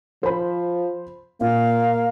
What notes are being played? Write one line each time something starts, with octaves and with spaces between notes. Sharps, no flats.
F3 C5 B5
A#2 A#3 F5